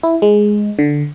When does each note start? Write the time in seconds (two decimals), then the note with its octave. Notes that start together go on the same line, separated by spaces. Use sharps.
0.03 E4
0.22 G#3
0.79 D3